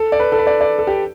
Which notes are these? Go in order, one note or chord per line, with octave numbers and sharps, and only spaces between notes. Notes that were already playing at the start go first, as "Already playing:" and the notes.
Already playing: A4
D5
B4
A4
B4
D5
D5
A4
G4